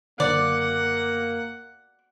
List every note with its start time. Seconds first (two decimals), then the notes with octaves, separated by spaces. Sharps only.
0.20 F#1 D3 A#3 D5 F#5